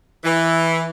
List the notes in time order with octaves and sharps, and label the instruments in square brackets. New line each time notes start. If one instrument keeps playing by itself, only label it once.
[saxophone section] E3